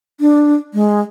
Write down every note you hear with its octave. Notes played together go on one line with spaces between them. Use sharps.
D4
G#3